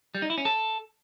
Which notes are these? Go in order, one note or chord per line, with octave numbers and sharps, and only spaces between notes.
G3
D#4
E4
C#4
A4